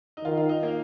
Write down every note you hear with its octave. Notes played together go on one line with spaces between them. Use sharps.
D#4
D#3 F4
F4
D#4
A#3